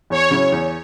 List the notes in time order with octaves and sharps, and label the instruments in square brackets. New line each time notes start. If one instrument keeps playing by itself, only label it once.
[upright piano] E2 [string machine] C#5
[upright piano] C#3 F#3 C#4 E4
E2